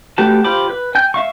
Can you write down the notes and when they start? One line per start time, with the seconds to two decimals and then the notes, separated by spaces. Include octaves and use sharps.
0.18 A3 F#4 G4 B4 A5
0.44 F4 G4 C5 B5 D6
0.70 B4
0.95 G5 G#5 G6
1.14 E5 F5 C#6